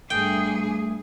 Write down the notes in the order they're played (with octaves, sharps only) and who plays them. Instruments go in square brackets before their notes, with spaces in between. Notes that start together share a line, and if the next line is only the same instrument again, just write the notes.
[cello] G2 G#4 [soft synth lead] A3 [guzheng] G5